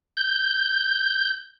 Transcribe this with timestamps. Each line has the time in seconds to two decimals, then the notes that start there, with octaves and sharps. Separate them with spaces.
0.17 G6